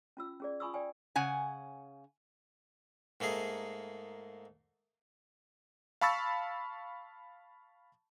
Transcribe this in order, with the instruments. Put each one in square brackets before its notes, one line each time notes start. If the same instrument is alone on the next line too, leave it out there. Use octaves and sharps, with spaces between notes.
[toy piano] C#4 F4 E6
C#4 G#4 D5
F4 G#5 B5 C#6 D#6 E6
D5 G5 G#5
[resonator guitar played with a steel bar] C#3 F#5 G#5
[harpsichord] G#2 A3 A#3 G#4
[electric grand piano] F5 A5 B5 C#6 E6 A6